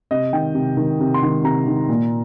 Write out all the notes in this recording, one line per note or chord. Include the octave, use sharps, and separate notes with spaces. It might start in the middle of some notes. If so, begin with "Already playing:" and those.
C3 D#5
D#3 G5
C3
D#3
C3
C6
D#3
C3 A#5
D#3
A#2